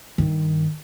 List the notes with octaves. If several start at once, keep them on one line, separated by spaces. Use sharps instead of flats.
G2 D#3